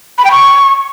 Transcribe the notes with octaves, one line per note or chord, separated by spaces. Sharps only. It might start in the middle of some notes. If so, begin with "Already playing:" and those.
B5
G5
C#6